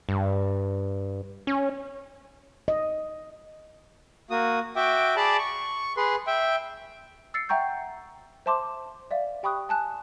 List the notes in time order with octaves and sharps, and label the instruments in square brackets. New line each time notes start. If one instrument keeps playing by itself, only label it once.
[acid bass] G2
C#4
[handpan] D#5
[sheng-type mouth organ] A#3 F#4 D#6
F#4 E5 G5 D6
G#4 D5 A5 B5 D6
C#6
G#4 B4 C6
E5 G5
[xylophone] E6 A6 C7 C#7
E5 F#5 G5 A#5 C#6 G6
C5 E5 A5 C6 D6
D5 E5 F5
G4 G5 B5 C#6 D#6 F#6
G#5 A5 F#6